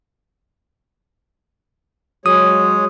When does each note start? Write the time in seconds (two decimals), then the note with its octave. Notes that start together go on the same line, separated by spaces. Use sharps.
2.26 F#3 G#3 G#4 C#5 D#6